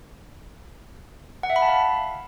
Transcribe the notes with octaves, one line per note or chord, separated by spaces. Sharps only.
F#5
E5
B5
A5
F5